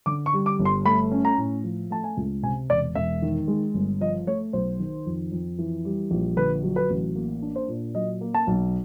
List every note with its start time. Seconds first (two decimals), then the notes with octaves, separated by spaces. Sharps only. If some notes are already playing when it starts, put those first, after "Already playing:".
0.06 D3 D6
0.26 C#6
0.33 G3
0.46 D6
0.59 G1
0.65 C6
0.85 A3 B5
1.12 C#4
1.25 A#5
1.38 A2
1.64 F3
1.90 A3 A5
2.04 G#5
2.17 C#2
2.43 C3 G#5
2.70 E1 D5
2.95 E1 E5
3.22 D#3
3.48 G#3
3.74 G1
4.01 F3 D#5
4.27 A3 C#5
4.53 B1 C5
4.80 D#3
5.06 F2
5.32 F2
5.58 E3
5.85 G3
6.11 A#1
6.37 D3 B4
6.63 F#3
6.76 B4
6.90 A1
7.16 A#3
7.42 D4
7.56 C5
7.68 A#2
7.95 F#3 D#5
8.21 A#3
8.34 A5
8.47 B1